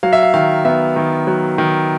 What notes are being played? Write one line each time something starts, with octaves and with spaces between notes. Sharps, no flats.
F#3 F5
E5
F5
D#3 F5
B3 E5
D#3
F#3
D#3